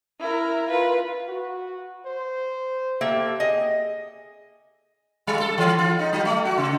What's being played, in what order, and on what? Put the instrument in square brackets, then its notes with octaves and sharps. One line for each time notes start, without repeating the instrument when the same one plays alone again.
[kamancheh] E4 A#4
F4 B4
[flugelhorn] F#4
C5
[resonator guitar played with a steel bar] A#3 A4 E5 [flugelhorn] G4
[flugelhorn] G#4 [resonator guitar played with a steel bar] D#5
[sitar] G3
A4
E3
F4
D#4
F#3
A3
F#4
C#3